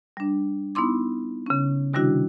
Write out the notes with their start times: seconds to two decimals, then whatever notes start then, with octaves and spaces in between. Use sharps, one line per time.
0.17 G3 D4
0.75 B3 D#4 E4 C6 D6
1.46 C#3 C#4
1.93 C3 D#3 G3 D4 E4 F#4